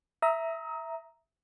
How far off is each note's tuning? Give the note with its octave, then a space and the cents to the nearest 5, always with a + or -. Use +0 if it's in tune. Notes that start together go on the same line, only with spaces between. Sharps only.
E5 +0 A#5 +0 D#6 +35